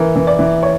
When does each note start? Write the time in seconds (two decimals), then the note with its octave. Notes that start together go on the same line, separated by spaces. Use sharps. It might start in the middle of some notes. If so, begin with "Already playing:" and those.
Already playing: E3 A#4
0.16 E3
0.27 D5
0.39 E3
0.63 C#5